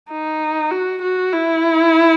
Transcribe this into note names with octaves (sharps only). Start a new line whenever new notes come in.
D#4
F#4
F#4
E4